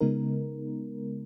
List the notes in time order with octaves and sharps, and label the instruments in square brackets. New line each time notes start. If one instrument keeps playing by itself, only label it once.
[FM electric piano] C#3 G#3 B3 D#4 A#4